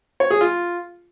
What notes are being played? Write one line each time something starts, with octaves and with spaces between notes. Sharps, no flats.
C#5
G#4
F4